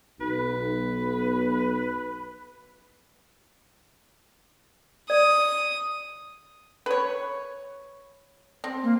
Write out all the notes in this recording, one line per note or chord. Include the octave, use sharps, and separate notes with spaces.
B1 B4
D5 D#6
B4 C#5
C4
A#3